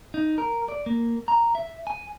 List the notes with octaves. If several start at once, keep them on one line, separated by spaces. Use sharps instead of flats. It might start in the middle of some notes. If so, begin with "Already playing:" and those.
D#4
A#4
D5
A#3
A#5
E5
G#5